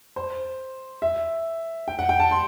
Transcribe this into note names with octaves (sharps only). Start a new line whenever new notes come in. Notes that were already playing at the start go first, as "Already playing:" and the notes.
C5
E5
G5
F#5
G5
A5
C6